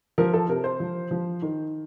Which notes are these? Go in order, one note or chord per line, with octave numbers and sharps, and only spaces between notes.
F3 A#4
A4
C3 A#4
C5
F3
F3
D#3